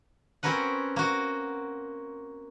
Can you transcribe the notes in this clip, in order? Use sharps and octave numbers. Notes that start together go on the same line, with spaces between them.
C4 C#4 F#4 A#4 B4 F#5
A#3 F#4